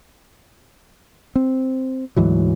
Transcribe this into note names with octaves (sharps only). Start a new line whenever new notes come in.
C4
D2 G#2 E3 F#3